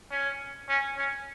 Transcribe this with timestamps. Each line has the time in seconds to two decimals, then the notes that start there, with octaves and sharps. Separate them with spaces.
0.11 C#4
0.69 C#4
0.97 C#4